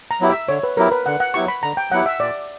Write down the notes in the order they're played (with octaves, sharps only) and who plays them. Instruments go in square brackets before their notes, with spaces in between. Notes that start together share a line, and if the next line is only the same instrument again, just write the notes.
[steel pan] A#5
[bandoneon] F#3 B3 E4 G4
[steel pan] E5
[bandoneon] D3 [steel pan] C#5
[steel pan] B4
[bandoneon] F#3 B3 E4 G4 [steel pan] A#4
[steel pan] B4
[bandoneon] D3 [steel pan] F#5
[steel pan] F#5
[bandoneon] F#3 B3 E4 G4 [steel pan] C#6
[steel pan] B5
[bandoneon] D3 [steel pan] A#5
[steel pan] G5
[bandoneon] F#3 B3 E4 G4 [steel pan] F#5
[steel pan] E5
[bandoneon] A#2 [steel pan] D5